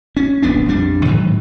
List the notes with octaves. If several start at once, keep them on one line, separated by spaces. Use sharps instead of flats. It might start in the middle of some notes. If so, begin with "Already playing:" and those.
C#4
D1 A#1 B3 D4
A#1 F2 G3 D4
G#2 D#3 E3 F#3